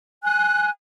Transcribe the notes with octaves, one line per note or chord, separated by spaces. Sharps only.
G#5 F#6